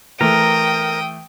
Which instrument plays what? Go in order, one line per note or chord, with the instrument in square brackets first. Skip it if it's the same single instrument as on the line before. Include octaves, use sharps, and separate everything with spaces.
[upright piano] E3 A3 [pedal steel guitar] A#4 [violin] G5 D#6